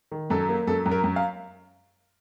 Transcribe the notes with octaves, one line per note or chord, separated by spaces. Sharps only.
D#3
F#2 A4
A#3
F#2 A4
F#2
A#4
F#2
F5